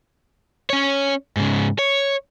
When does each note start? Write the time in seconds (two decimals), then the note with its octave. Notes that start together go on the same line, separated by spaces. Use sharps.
0.70 C#4 C#5
1.37 G#2 C#3
1.79 C#5